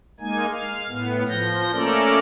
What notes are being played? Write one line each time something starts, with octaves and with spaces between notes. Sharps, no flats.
G#3 A#3 D#4 G#5
F5
A2 B3
F3 G6 A#6
A3 A#3 C#4 A4 A#4 D5